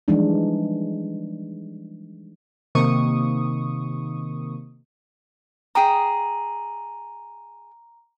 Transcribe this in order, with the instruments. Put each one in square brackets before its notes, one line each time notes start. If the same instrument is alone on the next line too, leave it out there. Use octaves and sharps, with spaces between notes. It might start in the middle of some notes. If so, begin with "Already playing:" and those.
[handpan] E3 F3 G3 G#3 D4 D#4
[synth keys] C3 D#3 A#3 C#6 D#6
[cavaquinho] G#4 G5 D#6 [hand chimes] A#5